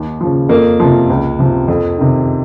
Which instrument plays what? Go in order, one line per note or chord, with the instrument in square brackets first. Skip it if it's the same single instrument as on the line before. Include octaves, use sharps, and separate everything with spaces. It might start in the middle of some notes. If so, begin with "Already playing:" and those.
Already playing: [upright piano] D#2
C#3 F3
F2 A#3
C3 F3
C#2
C3 F3
F2
C3 D#3